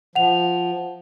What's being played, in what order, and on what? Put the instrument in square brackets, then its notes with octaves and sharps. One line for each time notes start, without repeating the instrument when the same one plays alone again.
[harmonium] F3 [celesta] F#5 F7